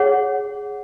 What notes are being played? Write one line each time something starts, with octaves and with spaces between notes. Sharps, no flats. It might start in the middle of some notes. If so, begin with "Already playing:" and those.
Already playing: G#4 C#5 F#5